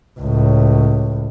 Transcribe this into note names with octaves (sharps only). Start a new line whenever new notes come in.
C#2 A2